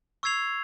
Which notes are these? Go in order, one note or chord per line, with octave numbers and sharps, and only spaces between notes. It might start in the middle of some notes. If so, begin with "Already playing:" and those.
C#6 E6 G#6 C7 F7